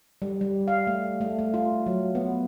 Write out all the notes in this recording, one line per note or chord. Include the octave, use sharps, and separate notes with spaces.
G3
G3
F5
A3
A3
A3
F4
F#3
B3